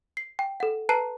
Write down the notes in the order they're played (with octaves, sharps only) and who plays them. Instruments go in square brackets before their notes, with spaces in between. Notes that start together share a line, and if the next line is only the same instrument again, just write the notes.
[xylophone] C7
G5
A4 F#5
B4 A5 A#5 F#6 C7 D#7